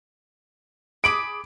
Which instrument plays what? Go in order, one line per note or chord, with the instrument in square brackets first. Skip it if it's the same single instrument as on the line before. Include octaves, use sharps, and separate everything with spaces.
[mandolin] G#4 B5 D6 [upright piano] D7